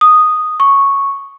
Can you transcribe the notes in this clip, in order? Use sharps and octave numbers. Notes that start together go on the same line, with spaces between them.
D#6
C#6